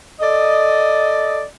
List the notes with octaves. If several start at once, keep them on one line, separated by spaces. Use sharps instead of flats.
A4 D5 D#5